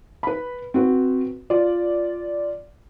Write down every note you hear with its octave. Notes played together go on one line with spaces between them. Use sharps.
B4 B5
C4 F#4 B4
F4 D5